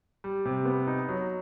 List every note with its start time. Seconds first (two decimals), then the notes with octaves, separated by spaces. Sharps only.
0.24 G3
0.46 C3
0.66 B3
0.87 D#4
1.09 F#3